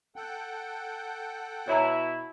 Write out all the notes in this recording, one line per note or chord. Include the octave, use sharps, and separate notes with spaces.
A4 F#5 G5
B2 E4 C#5 E5 A#5